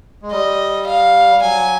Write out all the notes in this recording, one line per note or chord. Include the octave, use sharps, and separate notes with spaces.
G#3
G3 D#5
F5
F#3 G#5